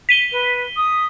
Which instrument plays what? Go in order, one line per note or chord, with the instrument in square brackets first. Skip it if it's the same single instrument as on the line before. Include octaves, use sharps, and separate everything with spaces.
[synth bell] B6 D#7 G7
[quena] B4
D#6